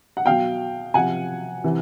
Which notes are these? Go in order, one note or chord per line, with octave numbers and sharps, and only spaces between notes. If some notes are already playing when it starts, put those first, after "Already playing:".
F#5
B2 F#3 F5 G5
C3 F3 F#5 G#5
C3 E3